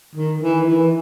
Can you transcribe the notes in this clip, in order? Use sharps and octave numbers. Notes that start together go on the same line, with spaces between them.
D#3
E3
E3